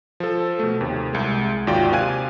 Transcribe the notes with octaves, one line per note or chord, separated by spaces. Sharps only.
F3 A4
B2 A3
D#2 C3
C2 G#3
G#1 D#2 F4 F#4 D5 G5
C3 F5 G#5 F#6 G#6 D#7